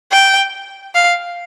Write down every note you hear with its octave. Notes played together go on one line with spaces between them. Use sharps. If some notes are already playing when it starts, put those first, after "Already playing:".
G5
F5